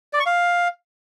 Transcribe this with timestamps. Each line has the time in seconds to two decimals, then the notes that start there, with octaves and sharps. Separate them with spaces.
0.13 D5
0.20 C#6
0.26 F5